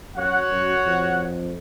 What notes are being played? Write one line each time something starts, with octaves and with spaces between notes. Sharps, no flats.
F#2 F#4 C#5 F#5
F#2
F2